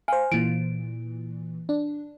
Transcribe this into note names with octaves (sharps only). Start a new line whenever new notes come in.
C5 F5 G#5
A#2 E3 D7
D4